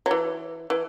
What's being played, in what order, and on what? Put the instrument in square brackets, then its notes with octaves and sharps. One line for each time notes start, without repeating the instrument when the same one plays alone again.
[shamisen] F#3
E3
E3